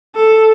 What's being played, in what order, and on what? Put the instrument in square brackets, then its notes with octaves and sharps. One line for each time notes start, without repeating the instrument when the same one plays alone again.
[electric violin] A4